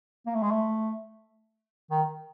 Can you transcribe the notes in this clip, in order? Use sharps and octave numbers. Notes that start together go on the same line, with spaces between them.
A#3
A3
G#3
A3
D#3